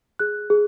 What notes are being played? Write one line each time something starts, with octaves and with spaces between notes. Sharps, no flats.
G#4 F#6
G#4